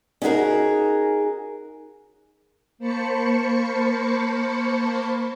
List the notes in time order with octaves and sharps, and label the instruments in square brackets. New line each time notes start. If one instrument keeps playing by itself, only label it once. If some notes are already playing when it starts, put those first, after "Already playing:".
[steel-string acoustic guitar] C#4 D#4 F#4 G#4 A#4
[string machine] A#3 C5 A5 B5 C#6 C#7